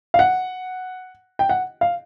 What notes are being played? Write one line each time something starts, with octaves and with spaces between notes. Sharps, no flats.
F5
F#5
G5
F#5
F5